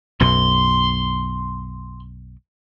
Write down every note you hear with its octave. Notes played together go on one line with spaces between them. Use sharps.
B1 F#2 B2 C6